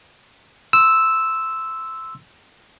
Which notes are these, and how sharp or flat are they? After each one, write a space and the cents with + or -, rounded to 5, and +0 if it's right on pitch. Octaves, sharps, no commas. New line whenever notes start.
C6 +0 E6 -5